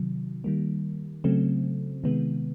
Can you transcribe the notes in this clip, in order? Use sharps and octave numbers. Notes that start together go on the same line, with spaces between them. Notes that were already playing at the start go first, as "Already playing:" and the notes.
Already playing: C3 D#3 F#3
D#3 G3 A#3
C#3 F#3 A3 C4
C3 D#3 G#3 B3